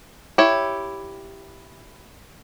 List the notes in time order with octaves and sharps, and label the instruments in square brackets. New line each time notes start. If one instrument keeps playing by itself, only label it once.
[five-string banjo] E4 G4 C#5